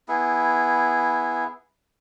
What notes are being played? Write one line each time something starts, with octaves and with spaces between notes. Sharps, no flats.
B3 E4 G#4